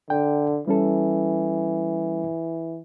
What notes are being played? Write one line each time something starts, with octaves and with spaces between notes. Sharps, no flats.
D3 G5
E3 G3 C#4 A4